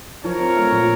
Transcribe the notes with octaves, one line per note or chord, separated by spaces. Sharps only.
F3 A#4 C#5
C4
A3
A#2